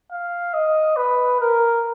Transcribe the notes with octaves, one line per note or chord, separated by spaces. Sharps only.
F5
D#5
B4
A#4